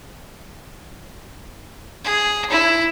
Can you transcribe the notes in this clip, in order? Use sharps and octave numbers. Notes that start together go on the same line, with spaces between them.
G#4
E4